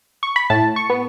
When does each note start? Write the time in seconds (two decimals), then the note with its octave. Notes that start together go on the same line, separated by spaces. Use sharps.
0.23 C#6
0.36 B5
0.50 A2 A5
0.76 C#6
0.90 B3